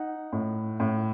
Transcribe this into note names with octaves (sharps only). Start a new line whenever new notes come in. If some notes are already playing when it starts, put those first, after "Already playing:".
Already playing: D#4 F#5
A2
A2